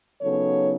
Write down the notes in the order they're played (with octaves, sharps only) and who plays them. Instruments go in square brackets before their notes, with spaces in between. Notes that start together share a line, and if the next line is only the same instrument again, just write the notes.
[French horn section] C#3 F#3 B3 D#4 A4 C#5